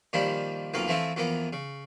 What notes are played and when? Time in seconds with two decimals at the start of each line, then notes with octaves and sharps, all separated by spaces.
0.13 A#2 D#3 F3 G3 C5 B5
0.74 B1 F2 F3 A#3 F5
0.88 E3 F3 A3 C4 E4 F4
1.16 F2 E3 A#3 B3
1.53 C#3